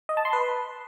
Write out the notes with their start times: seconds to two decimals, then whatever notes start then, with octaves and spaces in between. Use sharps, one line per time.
0.09 D#5
0.17 A5
0.25 C6
0.33 B4